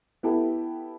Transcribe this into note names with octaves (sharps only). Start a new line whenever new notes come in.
B3 E4 G4 A4